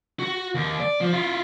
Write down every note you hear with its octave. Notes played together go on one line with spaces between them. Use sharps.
F#4
D#2
D5
F3
E4 F4